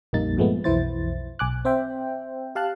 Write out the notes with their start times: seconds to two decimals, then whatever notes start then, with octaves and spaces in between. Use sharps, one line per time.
0.13 A#1 F2 G3 A#3 D#4 A6
0.37 G2 A#2 F3 G#3 A3 B3
0.64 B1 F2 E3 E4 C5 A6
1.39 B1 G#5 D6 F#6
1.65 C4 C5 E5 G5
2.55 G4 F5 A5 F#6